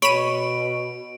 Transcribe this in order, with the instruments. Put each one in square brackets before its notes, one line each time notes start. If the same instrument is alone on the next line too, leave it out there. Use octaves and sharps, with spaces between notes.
[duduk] B2 [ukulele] C#5 [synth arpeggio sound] B5 D#7 [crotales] D7